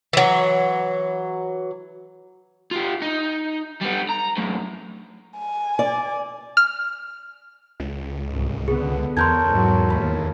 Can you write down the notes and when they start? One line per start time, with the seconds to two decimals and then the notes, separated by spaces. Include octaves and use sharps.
0.13 E3 F#3
2.71 F4 G4
3.02 D#4
3.81 G3 B3
4.09 A#5
4.37 F#2 A2
5.38 G#5
5.79 D5
6.57 F6
7.80 C#2
8.29 C2 G#2
8.68 D3 B3 G#4
9.17 E2 A4 A#4 C#5 C6 G6 G#6
9.48 G#2 F#3
9.90 D#2 B5